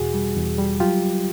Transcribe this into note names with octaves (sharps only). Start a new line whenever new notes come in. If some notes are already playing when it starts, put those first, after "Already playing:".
Already playing: E2 B2 F#4 G#4
G3
E2
G3
F#3 F4 G4